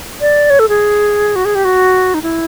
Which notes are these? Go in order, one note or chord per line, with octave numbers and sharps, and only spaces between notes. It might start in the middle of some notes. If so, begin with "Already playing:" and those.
D5
C#5
A4
G#4
F#4
G#4
G4
F#4
D#4
E4